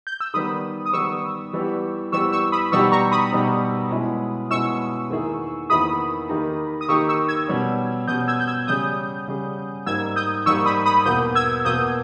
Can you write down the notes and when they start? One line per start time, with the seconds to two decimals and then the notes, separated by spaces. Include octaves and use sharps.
0.07 G6
0.20 E6
0.34 D#3 G3 B3 B5 D#6
0.86 D#6
0.93 D#3 G3 B3 C#6 E6
1.53 E3 G3 B3 G4
2.12 E3 G3 B3 G4 C#6 E6
2.32 C#6 E6
2.52 B5 D#6
2.71 B2 G3 B3 D#4 G4 C#6 E6
2.92 A#5 C#6
3.12 B5 D#6
3.32 B2 G3 B3 D#4 G4
3.91 B2 G#3 C#4 E4
4.50 B2 G#3 C#4 E4 C#6 E6
5.10 E2 D#3 A#3 E4 G#4
5.70 E2 D#3 A#3 E4 G#4 B5 D#6
6.29 D#3 A#3 D#4 G4
6.81 D#6
6.88 D#3 A#3 D#4 G4 C#6 E6
7.09 C#6 E6
7.28 E6 G#6
7.48 B2 G3 C#4
8.07 B2 G3 C#4 D#6 G6
8.28 E6 G#6
8.40 G6
8.47 E6 G#6
8.67 C#3 G3 C#4 G#4 D#6 G6
9.27 C#3 G3 C#4 G#4
9.86 G#2 G3 A#3 D#4 E6 G#6
10.16 D#6 G6
10.46 G#2 G3 A#3 D#4 C#6 E6
10.66 B5 D#6
10.86 B5 D#6
11.05 E2 B2 A#3 D#6 G6
11.35 E6 G#6
11.65 E2 B2 A#3 D#6 G6